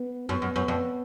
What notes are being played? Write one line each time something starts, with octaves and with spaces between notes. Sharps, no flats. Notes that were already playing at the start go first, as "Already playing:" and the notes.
Already playing: B3
F#2 B3
F#2
F#2
F2